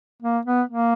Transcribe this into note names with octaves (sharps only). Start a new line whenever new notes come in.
A#3
B3
A#3